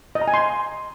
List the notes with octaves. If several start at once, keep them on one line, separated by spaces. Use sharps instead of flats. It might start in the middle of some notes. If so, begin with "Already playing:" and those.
D#5
A#5
G#5
C6